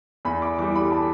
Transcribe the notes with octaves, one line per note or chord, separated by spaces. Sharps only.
E2 B5
D6
E3 G3 D6
B5
A5